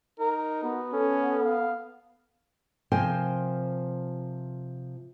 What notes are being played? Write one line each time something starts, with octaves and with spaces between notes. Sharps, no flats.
D#4 A#4
B3 F#4
C#4 A4
F5
C3 F3 A#4 C5 G5 G#5